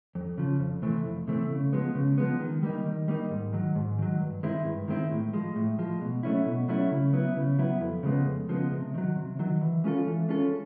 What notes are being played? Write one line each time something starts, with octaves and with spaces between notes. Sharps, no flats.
F2
C#3 F3
F2
C3 E3 A3 C4
F2
C3 E3 A3 C4
C#3
F3 G#3 B3
C#3
F3 G#3 B3
D#3
G3 A#3 D#4
D#3
G3 A#3 D#4
G#2
D#3 F#3
G#2
D#3 F#3
G2
D#3 G#3 C4 E4
G2
D#3 G#3 C4 E4
A2
F3 G#3
A2
F3 G#3
B2
F#3 A3 C#4 E4
B2
F#3 A3 C#4 E4
C#3
F#3 B3 E4
C#3
F#3 B3 E4
F2
C#3 F3 G#3 B3
F2
C#3 F3 G#3 B3
C3
D#3 F#3
C3
D#3 F#3
E3
G#3 C#4 F4 A4
E3
G#3 C#4 F4 A4